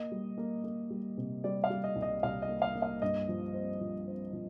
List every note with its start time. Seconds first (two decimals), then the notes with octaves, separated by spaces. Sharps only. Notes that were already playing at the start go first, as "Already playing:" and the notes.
Already playing: A#3 D#5
0.11 G3
0.38 A#3
0.64 A#3
0.90 G3
1.17 C3
1.44 G3 D5
1.64 F5
1.70 G3
1.84 D#5
1.96 C2
2.02 D#5
2.23 C2 F5
2.42 D#5
2.48 A#3
2.62 F5
2.75 A#3
2.82 F5
3.02 G2 D#5
3.28 F3
3.54 C4
3.81 F3
4.07 C4
4.33 F3